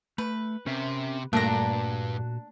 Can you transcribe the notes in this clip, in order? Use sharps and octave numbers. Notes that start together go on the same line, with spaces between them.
A3 B4
C3 C#4 A#4 E5
G2 A#2 A3 A#3 D4 F#4 A#5